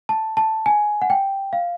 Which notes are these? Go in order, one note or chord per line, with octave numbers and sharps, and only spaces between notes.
A5
A5
G#5
F#5
G5
F5